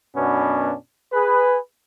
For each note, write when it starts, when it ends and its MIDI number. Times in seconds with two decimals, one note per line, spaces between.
0.16 0.74 42
0.16 0.74 47
0.16 0.74 59
0.16 0.74 61
0.16 0.74 62
1.13 1.58 68
1.13 1.58 71